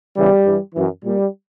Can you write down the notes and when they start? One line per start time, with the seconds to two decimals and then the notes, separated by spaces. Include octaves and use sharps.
0.16 E2 C#3 E3 G3
0.45 G2 E3
0.75 F#2 E3
1.04 A#2 G3